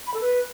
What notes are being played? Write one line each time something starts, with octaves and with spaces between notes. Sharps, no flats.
B5
A4
B4